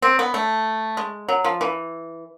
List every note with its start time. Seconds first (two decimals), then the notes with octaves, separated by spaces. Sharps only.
0.02 C4
0.19 B3
0.34 A3
0.97 G#3
1.28 F#3
1.44 F3
1.61 E3